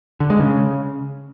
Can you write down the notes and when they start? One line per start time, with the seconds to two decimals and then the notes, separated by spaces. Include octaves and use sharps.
0.20 D3
0.30 G#3
0.40 C#3